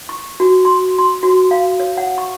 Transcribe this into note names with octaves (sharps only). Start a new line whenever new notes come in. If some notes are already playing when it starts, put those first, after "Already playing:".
C#6
F#4
C6
C6
F#4
F5
C#5
F#5
C#6